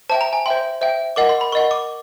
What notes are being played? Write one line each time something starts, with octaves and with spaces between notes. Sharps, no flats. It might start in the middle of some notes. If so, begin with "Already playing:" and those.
C5 E5 G5 A5
A#5
G#5
C5 E5 G5 C6
C5 E5 G5
A#4 D#5 F#5 D6
C6
B5
A#4 D#5 F#5 C#6
D6